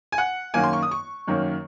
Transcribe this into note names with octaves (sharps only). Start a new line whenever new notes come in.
G#5
F#5
F#2 D#3 F#3 A#3 G#5
C6
C#6
D#6
C#6
F#2 D#3 F#3 A#3